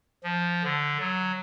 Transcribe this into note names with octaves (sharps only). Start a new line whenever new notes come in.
F3
D3
F#3